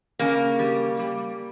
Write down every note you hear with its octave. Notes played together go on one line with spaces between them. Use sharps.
C#3 A#3
G3
G3